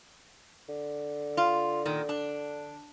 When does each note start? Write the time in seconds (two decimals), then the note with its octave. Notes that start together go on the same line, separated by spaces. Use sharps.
0.69 D3
1.37 F4
1.86 A#2 D#3
2.09 D4